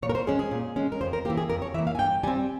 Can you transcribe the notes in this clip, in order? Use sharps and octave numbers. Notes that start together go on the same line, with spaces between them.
A#2 C#5
A#4
C5
G#3 C#4 G#4
G#4
A#2
G#3 C#4
A#4
F2 C5
A#4
E3 A#3 G4
G#4
F2 A#4
C#5
E3 A#3 E5
F5
G#5
G2 G5
G3 C4 G#5